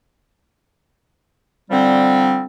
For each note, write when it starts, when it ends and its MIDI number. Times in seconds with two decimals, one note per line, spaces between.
1.71 2.45 50
1.71 2.45 53
1.71 2.45 55
1.71 2.45 60